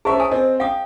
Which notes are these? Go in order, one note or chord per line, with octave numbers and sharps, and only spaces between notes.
C#4 G#4 C5 E5 A5 C#6
G#5 D#6
C4 D#5
F5 G5 D#6